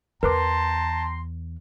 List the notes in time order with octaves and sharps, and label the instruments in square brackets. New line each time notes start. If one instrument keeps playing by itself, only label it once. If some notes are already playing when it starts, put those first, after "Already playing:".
[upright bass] E2 [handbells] A#4 B4 D6 [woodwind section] G5 A#5 C6 [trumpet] A5